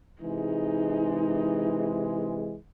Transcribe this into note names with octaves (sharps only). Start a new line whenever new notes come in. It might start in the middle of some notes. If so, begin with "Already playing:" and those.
C3 E3 G#3 D#4